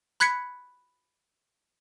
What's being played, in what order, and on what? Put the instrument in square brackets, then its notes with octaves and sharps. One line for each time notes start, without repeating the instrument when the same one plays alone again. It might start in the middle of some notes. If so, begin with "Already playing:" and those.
[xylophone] B5 F#6 G#6 B6 C#7